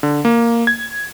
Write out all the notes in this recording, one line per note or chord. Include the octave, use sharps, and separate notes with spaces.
D3
A#3
G#6